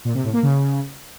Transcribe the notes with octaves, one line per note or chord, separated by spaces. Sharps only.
A#2
C3
A2
A#3
C#3